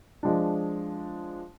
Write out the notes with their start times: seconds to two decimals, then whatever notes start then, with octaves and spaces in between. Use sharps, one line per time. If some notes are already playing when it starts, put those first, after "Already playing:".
0.23 F3 G#3 D4